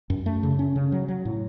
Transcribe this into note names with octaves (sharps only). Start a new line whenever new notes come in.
F#2
A3
C#3
C#4
C#3
F#3
F#3
A2